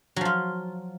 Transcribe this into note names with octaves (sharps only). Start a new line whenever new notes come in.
F3 F#3 F4